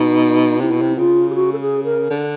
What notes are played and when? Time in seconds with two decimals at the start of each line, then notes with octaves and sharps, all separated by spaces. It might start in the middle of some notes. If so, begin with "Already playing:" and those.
Already playing: B2 D#4
0.60 C3 E4
0.71 B2
0.82 C3
0.98 C#3 F4
1.30 G4
1.35 F#4
1.53 A4
1.60 G#4
1.84 A#4
2.10 D3